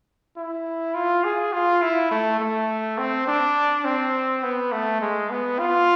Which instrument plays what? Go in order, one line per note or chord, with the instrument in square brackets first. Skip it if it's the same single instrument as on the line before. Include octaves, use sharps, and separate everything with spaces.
[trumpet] E4
F4
G#4
F4
E4
A3
A3
C4
D4
C4
B3
A3
G#3
B3
F4